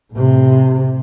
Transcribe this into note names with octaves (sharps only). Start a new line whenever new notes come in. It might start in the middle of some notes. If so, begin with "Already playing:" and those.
A2 C3